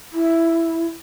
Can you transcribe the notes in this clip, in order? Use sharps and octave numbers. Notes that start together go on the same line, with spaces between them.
E4